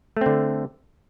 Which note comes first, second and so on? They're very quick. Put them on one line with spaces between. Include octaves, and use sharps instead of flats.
A3 C4 D3